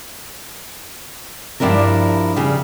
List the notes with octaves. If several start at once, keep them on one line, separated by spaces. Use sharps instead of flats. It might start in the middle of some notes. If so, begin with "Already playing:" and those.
G2 F3 G3 D4 E4 A#4
C#3 G3